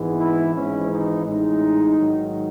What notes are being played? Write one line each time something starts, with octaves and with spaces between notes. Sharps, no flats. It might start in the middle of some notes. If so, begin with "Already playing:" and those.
Already playing: G#1 G#2 E3 G#3 B3
E4
G#1 G#2 E3 C#4
D#4
A1 A2 G#3 D#4
G#2 D#3 F#3